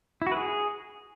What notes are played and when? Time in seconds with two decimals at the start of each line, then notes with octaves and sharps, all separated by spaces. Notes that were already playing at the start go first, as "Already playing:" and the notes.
0.22 E4
0.27 F#4
0.32 B4
0.37 G#4